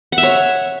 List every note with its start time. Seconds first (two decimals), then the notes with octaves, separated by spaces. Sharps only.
0.12 F#5
0.18 E5
0.23 C#5